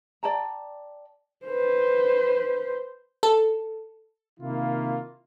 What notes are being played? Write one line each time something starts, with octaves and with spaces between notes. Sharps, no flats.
D5 G5 A5 A#5
B4 C5
A4
C3 D#3 A#3 E4 F4